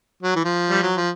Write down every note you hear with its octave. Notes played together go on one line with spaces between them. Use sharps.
F#3
E3
F3
G3
F#3
F3